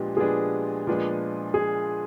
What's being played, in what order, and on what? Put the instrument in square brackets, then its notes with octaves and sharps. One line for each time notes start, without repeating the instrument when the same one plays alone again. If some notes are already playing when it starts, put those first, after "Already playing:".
Already playing: [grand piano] A#2 F3 G#3 B3 D4 [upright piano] G4
[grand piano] A#2 F3 G#3 B3 D4 [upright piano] G#4
[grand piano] A#2 F3 G#3 B3 D4
[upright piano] G#4